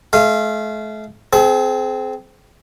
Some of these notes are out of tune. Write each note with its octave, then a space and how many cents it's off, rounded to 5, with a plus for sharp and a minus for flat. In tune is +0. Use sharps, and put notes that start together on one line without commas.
A3 -40 F5 -20
C4 -15 G#4 +35